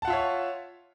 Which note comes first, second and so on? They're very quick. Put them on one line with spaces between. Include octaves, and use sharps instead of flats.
A5 F#5 F4 E5 C#5